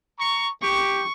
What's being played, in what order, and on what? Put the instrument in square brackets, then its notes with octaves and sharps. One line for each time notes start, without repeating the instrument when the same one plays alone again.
[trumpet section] A#5 C#6
[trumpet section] G4 [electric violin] C#6